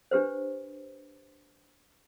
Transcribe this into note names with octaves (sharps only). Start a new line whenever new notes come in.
D4 G4 B4 C5